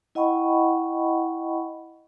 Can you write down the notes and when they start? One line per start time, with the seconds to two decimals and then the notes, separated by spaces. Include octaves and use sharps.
0.15 E4 D#5 F#5 G5 B5 C#6